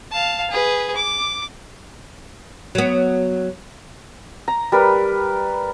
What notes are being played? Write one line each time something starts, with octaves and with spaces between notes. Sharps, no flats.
F5 A5
G#4 B4
D6
F#3 B3
A#5
G3 A#4 B4